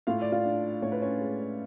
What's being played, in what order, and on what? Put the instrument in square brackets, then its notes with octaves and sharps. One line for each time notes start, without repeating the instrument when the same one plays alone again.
[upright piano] A2 F4 F5
D5
F4 F5
D4
A2 C#5
B4
C#4 C#5
G#3